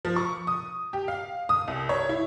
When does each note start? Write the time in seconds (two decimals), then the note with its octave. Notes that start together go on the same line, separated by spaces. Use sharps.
0.05 F3
0.16 C#6
0.47 D#6
0.93 G4
1.08 F5
1.49 D#6
1.68 C2
1.89 C#5
2.09 E4